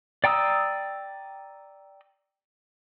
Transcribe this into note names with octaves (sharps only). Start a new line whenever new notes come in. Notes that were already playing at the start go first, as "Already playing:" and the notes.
D5 G5 A#5 D#6 E6